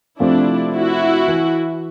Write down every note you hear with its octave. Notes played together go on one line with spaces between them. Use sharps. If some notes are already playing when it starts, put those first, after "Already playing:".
C3 F3 A3 C4 D4 E4
E4 F#4
E3